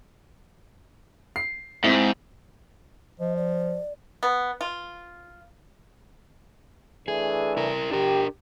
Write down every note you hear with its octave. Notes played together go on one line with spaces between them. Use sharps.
C7
G#2 C4 E4
F3 D#5
D5
B3
F4
E3 A3 D4 G#4
E4 A#4
D4 G4 A#4